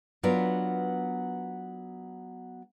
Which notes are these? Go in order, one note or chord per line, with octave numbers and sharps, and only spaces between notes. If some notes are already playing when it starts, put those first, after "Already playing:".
F#3 B3 D4 F4 A#4 B4